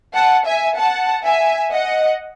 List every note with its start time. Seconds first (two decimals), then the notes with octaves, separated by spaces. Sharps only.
0.15 F#5 A5
0.46 E5 G#5
0.77 F#5 A5
1.25 E5 G#5
1.72 D#5 F#5